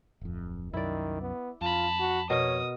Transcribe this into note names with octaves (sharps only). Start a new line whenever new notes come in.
D1 F2
C2 F#2 D#3 E4 D5
B3
F2 F4 A5 B5
F#4
B2 A#4 C#5 D#5 D#6